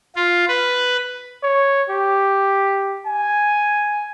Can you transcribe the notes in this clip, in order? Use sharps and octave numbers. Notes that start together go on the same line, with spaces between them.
F4
B4
C#5
G4
G#5